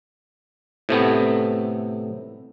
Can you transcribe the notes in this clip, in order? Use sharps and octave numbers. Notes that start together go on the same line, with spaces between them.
A2 C3 A3 B3